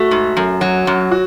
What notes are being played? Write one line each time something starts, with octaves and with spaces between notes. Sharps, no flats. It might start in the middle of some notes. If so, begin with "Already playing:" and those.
Already playing: A3 F#4
G#2
F#2
F#3
F#2
F#4